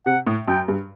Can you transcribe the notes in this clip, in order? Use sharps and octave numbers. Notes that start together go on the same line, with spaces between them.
C3 F#5
A2
F#2 G5
G2